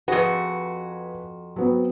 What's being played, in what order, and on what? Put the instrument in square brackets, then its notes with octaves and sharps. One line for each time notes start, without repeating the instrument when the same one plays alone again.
[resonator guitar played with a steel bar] F2 F#4 [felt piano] G#4 B4
[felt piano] F#3 B3 C4